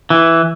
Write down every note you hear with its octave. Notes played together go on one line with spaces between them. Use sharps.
E3